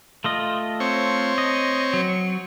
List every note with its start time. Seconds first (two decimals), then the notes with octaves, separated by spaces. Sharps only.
0.24 A3 F4 D#5
0.80 C4 C#5
1.38 D#5
1.93 F#3